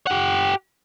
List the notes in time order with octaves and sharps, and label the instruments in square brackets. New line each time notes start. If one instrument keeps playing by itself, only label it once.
[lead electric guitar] G4 F#5